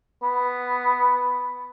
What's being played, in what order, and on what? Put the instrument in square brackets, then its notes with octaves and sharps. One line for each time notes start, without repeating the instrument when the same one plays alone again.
[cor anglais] B3